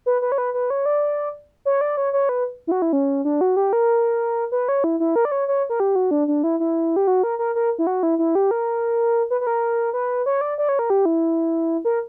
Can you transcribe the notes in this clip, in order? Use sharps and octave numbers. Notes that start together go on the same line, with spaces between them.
B4
B4
C#5
B4
B4
C#5
D5
C#5
D5
C#5
C#5
B4
E4
F#4
E4
C#4
D4
F#4
G4
A#4
B4
C#5
E4
E4
A#4
D5
C#5
C#5
A#4
G4
F#4
D4
D4
E4
E4
G4
F#4
A#4
A#4
A#4
E4
F#4
E4
E4
G4
A#4
B4
B4
A#4
B4
C#5
D5
D5
C#5
A#4
G4
E4
A#4